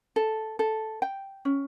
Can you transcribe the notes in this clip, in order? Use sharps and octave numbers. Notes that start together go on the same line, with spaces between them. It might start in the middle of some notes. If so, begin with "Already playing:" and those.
A4
A4
G5
C#4